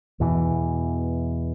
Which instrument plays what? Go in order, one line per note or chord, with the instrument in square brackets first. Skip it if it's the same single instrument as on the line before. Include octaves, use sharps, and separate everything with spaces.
[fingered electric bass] E2 B2 E3